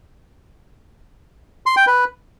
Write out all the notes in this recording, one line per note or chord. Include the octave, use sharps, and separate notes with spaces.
C6
G5
B4